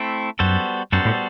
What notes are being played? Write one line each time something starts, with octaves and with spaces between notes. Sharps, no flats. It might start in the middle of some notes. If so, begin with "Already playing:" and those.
Already playing: A3 C4 E4
F#2 G3 B3 F#4 A4 C5
F#2 G3 B3 F#4 A4 C5
A2